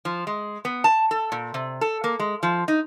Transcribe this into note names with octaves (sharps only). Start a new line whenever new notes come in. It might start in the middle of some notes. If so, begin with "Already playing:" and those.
F3
G#3
B3
A5
A4
A#2
C3
A4
A#3
G#3
F3
D#4